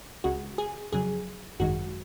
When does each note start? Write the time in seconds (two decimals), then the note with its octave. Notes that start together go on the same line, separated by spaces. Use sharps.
0.24 C#2 C#3 G#3 F#4
0.58 G#4
0.92 F2 C#3 F#3 G#4
1.60 G#1 F#2 D#3 G#3 F#4